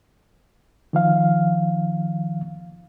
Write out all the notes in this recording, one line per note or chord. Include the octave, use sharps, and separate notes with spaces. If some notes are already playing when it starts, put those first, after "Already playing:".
D#3 F3 F5